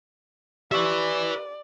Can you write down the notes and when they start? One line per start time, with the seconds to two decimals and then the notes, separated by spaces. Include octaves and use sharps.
0.72 G4 B4 D5 E5 C#6